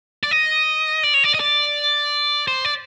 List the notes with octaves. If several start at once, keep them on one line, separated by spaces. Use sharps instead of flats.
D5
D#5
D5
C#5
D5
D#5
D5
C5
D5